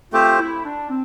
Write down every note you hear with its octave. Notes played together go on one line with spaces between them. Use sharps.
A3 C4 F4 G4 C5
E4
D4
C4